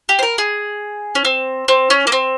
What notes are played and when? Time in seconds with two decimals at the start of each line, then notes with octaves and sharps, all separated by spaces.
0.09 G4
0.19 C5
0.23 A#4
0.38 G#4
1.15 C#4
1.25 C4
1.68 C4
1.90 C#4
2.07 A#3
2.12 C4